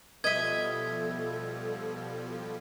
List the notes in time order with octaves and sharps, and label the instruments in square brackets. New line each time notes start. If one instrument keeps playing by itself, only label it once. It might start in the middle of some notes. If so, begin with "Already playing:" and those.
[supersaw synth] B2 F3 G3 [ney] A4 [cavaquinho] D#5 E5 [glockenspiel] G#6